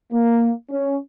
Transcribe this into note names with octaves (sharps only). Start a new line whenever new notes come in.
A#3
C#4